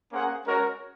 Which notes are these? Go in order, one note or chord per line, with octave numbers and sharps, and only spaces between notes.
A#3 C#4 G#4 C5 F#5
G#3 C#4 F#4 A#4 C#5